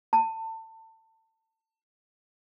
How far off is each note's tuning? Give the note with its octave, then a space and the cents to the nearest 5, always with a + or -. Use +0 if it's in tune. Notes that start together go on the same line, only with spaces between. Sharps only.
A5 +25